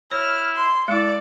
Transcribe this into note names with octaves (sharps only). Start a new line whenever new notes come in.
E4 C#5 F6
C6
G#3 E4 A4 D5